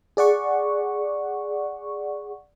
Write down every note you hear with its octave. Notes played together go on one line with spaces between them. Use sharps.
G#4 D5 F#5 C#6